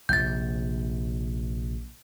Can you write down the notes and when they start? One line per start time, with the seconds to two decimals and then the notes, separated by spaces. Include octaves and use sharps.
0.09 A#1 C3 G6 A6